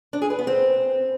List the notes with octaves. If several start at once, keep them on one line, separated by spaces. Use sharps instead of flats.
D4
G#4
B4
B3
C4